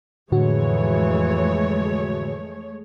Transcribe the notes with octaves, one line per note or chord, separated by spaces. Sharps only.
F2 A2 D3 E3 G#3 A3 F#4 C#5